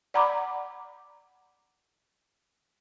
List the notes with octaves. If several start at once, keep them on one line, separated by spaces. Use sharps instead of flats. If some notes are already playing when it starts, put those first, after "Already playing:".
D5 F#5 A#5 B5 D6